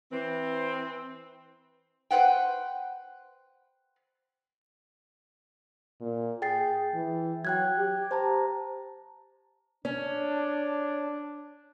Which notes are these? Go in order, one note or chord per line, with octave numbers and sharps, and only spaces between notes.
E3 C4
B4 C5 F#5 G5
A#2
G#4 G5 A6 C7
E3
F#3 G5 F#6 G#6
G4
C5 A5 A#5
C#4 D4